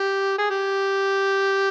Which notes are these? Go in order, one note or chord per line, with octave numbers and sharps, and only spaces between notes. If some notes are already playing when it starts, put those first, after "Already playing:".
Already playing: G4
G#4
G4